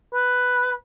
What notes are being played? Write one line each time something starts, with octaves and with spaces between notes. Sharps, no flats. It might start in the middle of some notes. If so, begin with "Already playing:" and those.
B4